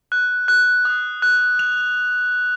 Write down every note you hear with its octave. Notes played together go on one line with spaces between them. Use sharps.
F#6
F#6
D#6
F#6
F7